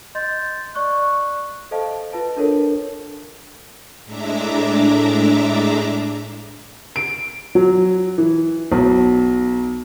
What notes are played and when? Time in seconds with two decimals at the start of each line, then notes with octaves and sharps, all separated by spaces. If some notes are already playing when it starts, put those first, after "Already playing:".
0.15 D#5 C6 G6 A6
0.75 D5 C#6 F#6
1.71 A4 C5 D#5 F5 A5
2.13 F4 B4 A5
2.37 D4 A4 A#4 C#5
4.05 A2 G#3 D4 E5 A#5 D6
6.96 D7
7.55 F#3
8.18 E3
8.72 B1